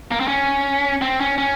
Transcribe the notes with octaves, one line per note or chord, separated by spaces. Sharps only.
A#3
C4
C#4
C4
C#4
C#4